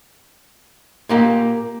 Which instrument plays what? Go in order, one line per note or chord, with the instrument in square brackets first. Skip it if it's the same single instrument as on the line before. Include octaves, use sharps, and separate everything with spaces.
[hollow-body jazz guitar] A#2 A#3 G4